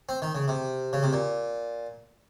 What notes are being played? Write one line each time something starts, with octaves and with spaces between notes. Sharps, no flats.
C4
D#3
C#3
C3
C#3
C3
A#2